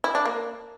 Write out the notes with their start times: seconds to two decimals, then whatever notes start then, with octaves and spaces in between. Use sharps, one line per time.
0.04 E4
0.15 D4
0.25 A#3